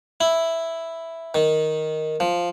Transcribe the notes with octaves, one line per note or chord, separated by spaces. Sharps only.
E4
D#3
F3